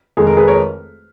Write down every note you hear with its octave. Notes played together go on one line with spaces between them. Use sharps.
F1 F2 D#3 G#3 G#4
A#4
G#4 B4
A#4 C#5